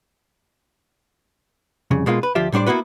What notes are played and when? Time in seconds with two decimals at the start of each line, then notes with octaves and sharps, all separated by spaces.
1.91 C2 F2 C#3
2.06 B2 G#3 A#3 F4
2.23 B4
2.35 D2 F3 F4 G4 E5
2.52 A2 G3 D4 C5 D5
2.66 A#3 B3 E4 F#4 B4